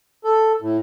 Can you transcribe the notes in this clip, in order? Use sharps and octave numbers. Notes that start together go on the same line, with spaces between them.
A4
A2